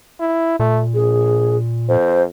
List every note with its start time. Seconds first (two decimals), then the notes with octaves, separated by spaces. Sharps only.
0.20 E4
0.60 A#2 A3
0.94 A#1 G#4
1.89 F2 C5